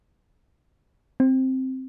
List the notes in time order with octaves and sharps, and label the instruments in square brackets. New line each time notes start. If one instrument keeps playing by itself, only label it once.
[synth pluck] C4